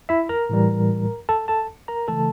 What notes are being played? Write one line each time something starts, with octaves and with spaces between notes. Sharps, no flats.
E4 E5
A#4 A#5
A2 E3 G3
A4 A5
A4 A5
A#4 A#5
C#3 E3 A3 A4 A5